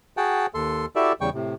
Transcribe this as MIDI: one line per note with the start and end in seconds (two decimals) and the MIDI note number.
0.17 0.46 66
0.17 0.46 68
0.17 0.46 78
0.17 0.46 79
0.17 0.46 81
0.54 0.86 39
0.54 0.86 69
0.54 0.86 84
0.96 1.13 64
0.96 1.13 66
0.96 1.13 67
0.96 1.13 69
0.96 1.13 74
0.96 1.13 76
1.21 1.30 40
1.21 1.30 49
1.21 1.30 55
1.21 1.30 79
1.21 1.30 85
1.34 1.54 45
1.34 1.54 48